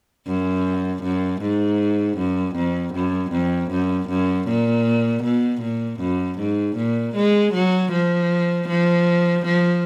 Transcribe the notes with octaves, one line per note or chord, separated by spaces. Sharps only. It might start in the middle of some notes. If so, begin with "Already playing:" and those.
F#2
F#2
G#2
F#2
F2
F#2
F2
F#2
F#2
A#2
B2
A#2
F#2
G#2
A#2
G#3
F#3
F3
F3
F3